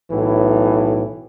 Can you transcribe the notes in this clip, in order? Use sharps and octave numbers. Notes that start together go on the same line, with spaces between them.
B1 A2 E3